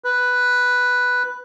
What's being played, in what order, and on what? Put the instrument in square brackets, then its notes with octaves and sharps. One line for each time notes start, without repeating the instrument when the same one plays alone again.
[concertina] B4